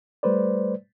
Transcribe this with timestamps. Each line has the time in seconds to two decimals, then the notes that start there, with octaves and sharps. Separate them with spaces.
0.23 G3 A3 B4 C5 D5